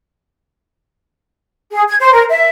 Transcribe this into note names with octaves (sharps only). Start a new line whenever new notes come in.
G#4
G#6
C5
A#4
E5